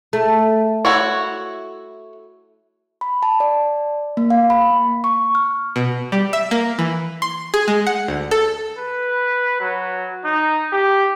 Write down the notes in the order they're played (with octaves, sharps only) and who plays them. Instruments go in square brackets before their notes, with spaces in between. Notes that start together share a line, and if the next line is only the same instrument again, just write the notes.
[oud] A3
[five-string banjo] E4 F#4 C#5
[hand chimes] B5
A5
D5
A#3
F5
B5
A#3
C#6
F6
[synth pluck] B2
G3
E5
A#3
E3
C6
G#4
G#3
F#5
D2
A4
[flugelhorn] B4
F#3
D#4
G4